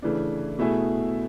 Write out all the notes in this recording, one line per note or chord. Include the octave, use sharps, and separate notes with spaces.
C#3 E3 A3 D4
B2 A3 E4 G#4